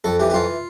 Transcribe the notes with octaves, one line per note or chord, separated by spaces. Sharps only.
F2 A4
E3 G4
G4
F2 F4